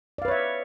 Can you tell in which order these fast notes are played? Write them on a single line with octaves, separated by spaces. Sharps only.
D5 F5 B4 C#5 E5